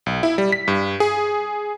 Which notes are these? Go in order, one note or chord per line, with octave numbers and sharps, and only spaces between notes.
B1
E4
G3
B6
G2
G#4